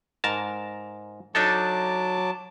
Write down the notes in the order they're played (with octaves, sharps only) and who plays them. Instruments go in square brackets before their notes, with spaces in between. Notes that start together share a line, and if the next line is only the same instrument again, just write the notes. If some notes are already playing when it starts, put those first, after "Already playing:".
[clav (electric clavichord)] G#2 A#4 A5
[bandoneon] F#3 A5 D6 [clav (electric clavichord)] D4 D#4 A4